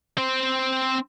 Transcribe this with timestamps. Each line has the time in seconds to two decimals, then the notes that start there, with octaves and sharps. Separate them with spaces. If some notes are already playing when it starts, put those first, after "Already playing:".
0.18 C4 C5